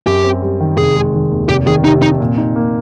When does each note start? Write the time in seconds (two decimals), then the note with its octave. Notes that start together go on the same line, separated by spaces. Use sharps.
0.06 F#2 G4
0.24 C4
0.42 G3
0.60 D#3
0.78 F1 G#4
0.96 G#3
1.13 D#3
1.31 D#2
1.49 F1 G4
1.67 D#3 G#4
1.84 C3 D#4
2.02 F2 D#4
2.20 A#2
2.38 D#4
2.56 A#3